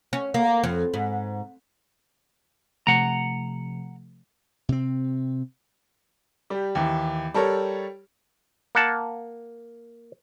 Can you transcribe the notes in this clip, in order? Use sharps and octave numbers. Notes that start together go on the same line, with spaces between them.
C#4
A#3
F2
G#2
C3 F3 A3 F#5 A#5
C3 C4
G3 G4
D#2 E3
G3 A4 A#4 C#5
A#3 F#5 A5